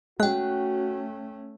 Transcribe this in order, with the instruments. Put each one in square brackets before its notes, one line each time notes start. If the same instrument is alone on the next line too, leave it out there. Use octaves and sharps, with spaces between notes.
[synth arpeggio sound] G#3 [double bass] A3 C#4 [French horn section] F#4 [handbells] G5 F#6